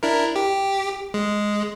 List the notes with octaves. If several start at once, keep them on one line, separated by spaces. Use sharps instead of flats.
D4 E4 A#4
G4
G#3